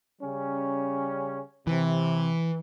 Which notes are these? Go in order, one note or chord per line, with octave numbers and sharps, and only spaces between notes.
C#3 G3 C#4
C3 E3